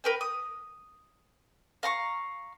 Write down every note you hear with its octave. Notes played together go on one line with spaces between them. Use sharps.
A#4 B4 G5
D#6
F5 A#5 C6 C#6